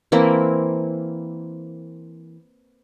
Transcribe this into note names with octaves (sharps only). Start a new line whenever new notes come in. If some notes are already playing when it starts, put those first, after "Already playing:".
E3 A#3 C4 E4